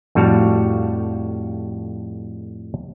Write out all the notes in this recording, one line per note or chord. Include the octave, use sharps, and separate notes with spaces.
F2 A2 G3 F#4 F5 A5